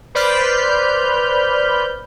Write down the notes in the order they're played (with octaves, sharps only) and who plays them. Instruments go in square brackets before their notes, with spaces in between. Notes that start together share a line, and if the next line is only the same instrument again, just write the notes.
[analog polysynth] B4 C5 D5 B5 F6 G6